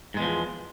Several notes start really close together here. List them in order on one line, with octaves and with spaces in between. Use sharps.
G#2 G#3 E2 F3